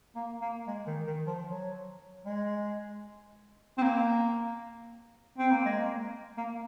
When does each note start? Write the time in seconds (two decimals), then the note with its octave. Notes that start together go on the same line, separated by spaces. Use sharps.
0.16 A#3
0.41 A#3
0.67 G#3
0.87 D#3
1.07 D#3
1.27 F3
1.47 F#3
2.25 G#3
3.78 C4
3.82 A#3
5.38 C4
5.51 A#3
5.65 G#3
5.78 A#3
6.38 A#3